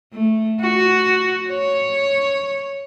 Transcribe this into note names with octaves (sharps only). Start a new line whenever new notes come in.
A3
F#4
C#5